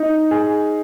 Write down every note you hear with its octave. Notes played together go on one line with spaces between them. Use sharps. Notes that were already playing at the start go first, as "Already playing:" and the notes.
Already playing: D#4
G#4